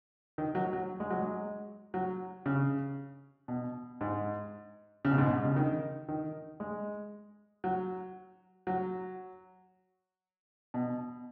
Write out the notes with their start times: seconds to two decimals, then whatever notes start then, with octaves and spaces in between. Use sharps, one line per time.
0.38 D#3
0.55 F#3
0.73 F#3
1.00 G#3
1.10 F#3
1.22 G#3
1.94 F#3
2.46 C#3
3.48 B2
4.01 G#2
5.05 C#3
5.11 B2
5.18 G#2
5.26 B2
5.45 C#3
5.56 D#3
6.09 D#3
6.60 G#3
7.64 F#3
8.67 F#3
10.74 B2